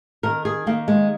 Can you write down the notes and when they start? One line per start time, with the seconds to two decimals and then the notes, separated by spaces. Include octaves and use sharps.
0.23 D#3 A#4
0.45 G#4
0.66 D#3 A#3
0.88 G#3